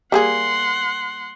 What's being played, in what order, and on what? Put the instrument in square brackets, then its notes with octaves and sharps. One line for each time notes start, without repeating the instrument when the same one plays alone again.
[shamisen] G3 A#3 G#4 [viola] F#5 C6